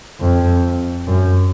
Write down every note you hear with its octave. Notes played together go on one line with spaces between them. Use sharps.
F2
F#2